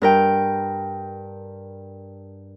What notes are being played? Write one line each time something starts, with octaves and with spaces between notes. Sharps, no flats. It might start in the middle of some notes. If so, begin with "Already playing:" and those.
G2 A#4 G5